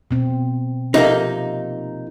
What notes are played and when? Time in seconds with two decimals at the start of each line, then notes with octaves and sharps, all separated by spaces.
0.11 B2 C4
0.94 C3 F3 A#3 D#4